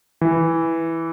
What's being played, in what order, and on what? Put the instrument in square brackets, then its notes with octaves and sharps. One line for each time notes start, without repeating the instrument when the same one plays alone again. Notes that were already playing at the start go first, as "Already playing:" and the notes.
[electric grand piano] E3